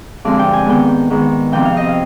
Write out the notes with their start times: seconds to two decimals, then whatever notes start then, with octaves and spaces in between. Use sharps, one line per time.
0.25 G2 D3 F3 G#3 C4 D5
0.39 G5
0.53 G#5
0.66 G#2 D#3 B3 G5
1.10 G#2 D#3 B3
1.52 F2 C3 F3 C4 G5
1.65 F5
1.77 D#5
1.89 F5